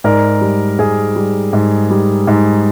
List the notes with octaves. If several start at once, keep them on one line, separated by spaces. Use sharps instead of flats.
G#2 A#4 D5
G3
G#2 G#4
G3
G#2
G3
G#2